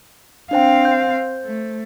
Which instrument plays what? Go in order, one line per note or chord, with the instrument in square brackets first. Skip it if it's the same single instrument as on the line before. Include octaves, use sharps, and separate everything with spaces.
[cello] C4 F5 [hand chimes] D4 C5 G5
[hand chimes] C5 G6
[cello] A3